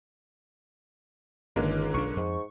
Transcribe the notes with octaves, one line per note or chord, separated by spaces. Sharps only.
G1 C#2 D3 D#3 G#3 A#3
B1 D4 C#6
F2 G#2